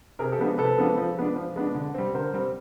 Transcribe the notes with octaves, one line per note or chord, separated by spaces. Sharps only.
C3 G#4 A#4
G4 A4
F3 G#3 B3 D4
C3 A4 B4
F3 G#3 B3 D4
F3
G#3 B3 D4
F3
G#3 B3 D4
D3
G3 C4
D3 A#4 C5
G3 C4